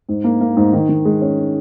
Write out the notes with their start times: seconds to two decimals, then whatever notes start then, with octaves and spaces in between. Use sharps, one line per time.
0.08 G#2
0.24 A#3
0.41 A#3
0.57 G#2
0.73 D#3
0.89 D#3
1.05 G#3
1.21 C#4